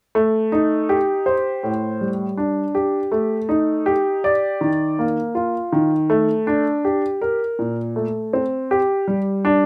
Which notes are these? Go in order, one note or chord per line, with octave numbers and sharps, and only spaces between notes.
A3
D#4
G4
C5
A2
G3
D4
G4
A3
D#4
G4
D5
D#3
A#3
F4
D#3
A3
D4
G4
A#4
A#2
A3
C4
G4
G3
D4